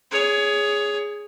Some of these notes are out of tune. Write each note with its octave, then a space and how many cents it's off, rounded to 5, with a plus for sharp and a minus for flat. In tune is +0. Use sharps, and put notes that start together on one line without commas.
G#4 +0 C#5 +20